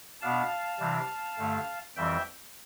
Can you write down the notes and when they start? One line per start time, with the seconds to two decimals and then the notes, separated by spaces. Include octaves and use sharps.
0.21 B2 B3 D4 F5 A5
0.79 C3 E3 G3 D4
1.38 G2 D3 A3
1.96 F2 E3 G3 C4 E5 G5